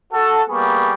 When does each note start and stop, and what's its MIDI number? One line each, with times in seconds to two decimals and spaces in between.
0.13 0.41 66
0.13 0.41 69
0.50 0.94 55
0.50 0.94 58
0.50 0.94 59
0.50 0.94 68
0.50 0.94 83
0.50 0.94 85